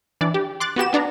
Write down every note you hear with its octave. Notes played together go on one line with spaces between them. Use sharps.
E3 D4 D5
G4
C6 D6 F#6 A6
B3 F#4 G4 E7
B3 D4 D5 A#5